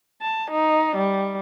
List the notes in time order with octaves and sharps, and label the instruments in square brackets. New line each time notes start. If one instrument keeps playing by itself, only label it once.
[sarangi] A5
D#4
G3